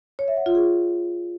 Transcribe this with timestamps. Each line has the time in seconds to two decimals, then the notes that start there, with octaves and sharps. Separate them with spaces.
0.19 C#5
0.28 E5
0.37 F#5
0.46 F4
0.55 G#4